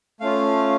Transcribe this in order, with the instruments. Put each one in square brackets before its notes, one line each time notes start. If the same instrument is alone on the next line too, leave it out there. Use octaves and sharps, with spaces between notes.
[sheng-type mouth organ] A3 C#4 F4 F5